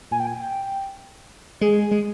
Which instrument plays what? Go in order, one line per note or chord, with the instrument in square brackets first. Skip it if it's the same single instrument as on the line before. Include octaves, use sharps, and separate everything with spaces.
[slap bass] A#2 [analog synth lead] G#5
[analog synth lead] G5
G#5
G5
[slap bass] G#3 [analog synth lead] G#4
[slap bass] G#3